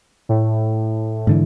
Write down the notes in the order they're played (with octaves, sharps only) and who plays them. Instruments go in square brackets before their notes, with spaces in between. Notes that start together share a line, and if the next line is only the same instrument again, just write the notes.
[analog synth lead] A2
[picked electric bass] G#2 D3 E3